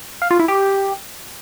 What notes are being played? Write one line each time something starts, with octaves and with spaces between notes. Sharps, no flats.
F5
F4
E4
G4